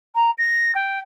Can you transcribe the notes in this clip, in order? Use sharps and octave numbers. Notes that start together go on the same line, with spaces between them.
A#5
A#6
G5